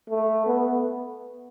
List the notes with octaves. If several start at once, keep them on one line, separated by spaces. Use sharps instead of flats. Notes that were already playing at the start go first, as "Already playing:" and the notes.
A3
B3